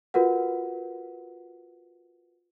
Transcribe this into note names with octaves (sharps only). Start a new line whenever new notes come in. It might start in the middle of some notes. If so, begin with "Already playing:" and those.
F4 F#4 A#4 B4 F#5